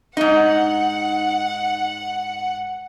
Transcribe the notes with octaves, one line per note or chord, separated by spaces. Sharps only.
G#2 D#4 F#5